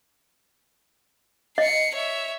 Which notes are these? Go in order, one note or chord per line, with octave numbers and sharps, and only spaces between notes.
D#5 C7 C#7
C#5 E5